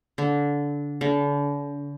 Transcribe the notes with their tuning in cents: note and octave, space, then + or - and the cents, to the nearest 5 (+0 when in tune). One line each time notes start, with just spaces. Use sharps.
D3 -20
D3 -40